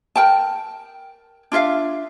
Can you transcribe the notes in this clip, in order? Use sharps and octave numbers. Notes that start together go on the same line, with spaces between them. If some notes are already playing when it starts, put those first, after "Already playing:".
A#4 G5 A5
D4 F4 E5 F5